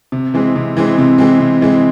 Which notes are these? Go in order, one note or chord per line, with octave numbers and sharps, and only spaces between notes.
C3
E3 G#3 C4
C3
E3 G#3 C4
C3
E3 G#3 C4
C3
E3 G#3 C4